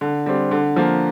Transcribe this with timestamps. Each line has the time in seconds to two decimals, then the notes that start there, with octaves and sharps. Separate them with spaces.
0.01 D3
0.26 G3 C4
0.51 D3
0.76 F3 A#3